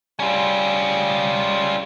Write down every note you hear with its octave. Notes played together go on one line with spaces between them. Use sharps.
G3 C#4 F4